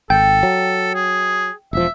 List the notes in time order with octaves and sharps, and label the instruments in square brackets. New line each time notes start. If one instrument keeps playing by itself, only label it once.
[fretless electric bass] G#1 [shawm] A4 [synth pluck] G5
[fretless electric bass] F#3
[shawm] G#4
[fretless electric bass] E1 F3 [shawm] E5